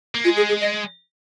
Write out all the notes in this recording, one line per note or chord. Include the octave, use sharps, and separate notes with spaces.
A#3
G#3 F4
G#4
G#4
D#5